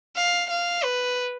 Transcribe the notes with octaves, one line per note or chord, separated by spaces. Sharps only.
F5
F5
B4